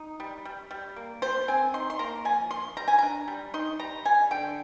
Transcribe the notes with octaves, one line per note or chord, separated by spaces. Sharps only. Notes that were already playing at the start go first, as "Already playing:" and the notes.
Already playing: D#4
G3
G3
G3
A#3
G3 C5
C4 G#5
D#4 C6
C6
A#3 A#5
F3 G#5
F3 C6
G3 A#5
G#5
D4 A#5
G3
D#4 C6
G3 A#5
G3 G#5
D3 G5